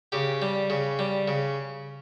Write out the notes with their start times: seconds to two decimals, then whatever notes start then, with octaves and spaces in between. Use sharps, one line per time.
0.12 C#3 G4
0.42 G3
0.70 C#3
0.99 G3
1.28 C#3